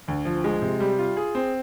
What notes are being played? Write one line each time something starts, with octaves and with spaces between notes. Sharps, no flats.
D2
F3
G#3
C3
G3
F4
G#4
C4